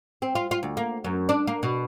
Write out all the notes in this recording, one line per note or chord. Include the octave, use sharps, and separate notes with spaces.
C4
F4
F4
D2
A#3
F#2
D4
A#3
B2